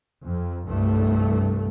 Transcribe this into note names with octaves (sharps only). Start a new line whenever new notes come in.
F2
C2 G2 A3